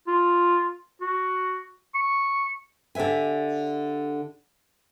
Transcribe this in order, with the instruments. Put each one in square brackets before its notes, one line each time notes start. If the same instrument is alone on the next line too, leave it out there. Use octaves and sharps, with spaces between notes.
[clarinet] F4
F#4
C#6
[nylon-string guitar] D3 G4 B4 E5 G#5